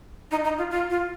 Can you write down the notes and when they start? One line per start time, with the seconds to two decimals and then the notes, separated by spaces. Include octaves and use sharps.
0.31 D#4
0.44 D#4
0.58 F4
0.71 F4
0.90 F4